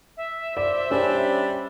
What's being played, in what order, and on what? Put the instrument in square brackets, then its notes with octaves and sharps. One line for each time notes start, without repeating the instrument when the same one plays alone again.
[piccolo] E5
[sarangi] C5 [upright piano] D5
[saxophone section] G3 D4 [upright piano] C#4